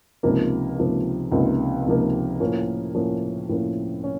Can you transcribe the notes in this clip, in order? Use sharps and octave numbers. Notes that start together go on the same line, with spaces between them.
C#2 C3 F3 A#3 D#4
C#2 C3 F3 A#3 D#4
C#2 C3 F3 A#3 D#4
C#2 C3 F3 A#3 D#4
A2 F3 A#3 C#4
A2 F3 A#3 C#4
A2 F3 A#3 C#4
C#4